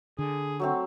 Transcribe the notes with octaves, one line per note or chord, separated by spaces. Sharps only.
D3 G#4
F#3 A3 C4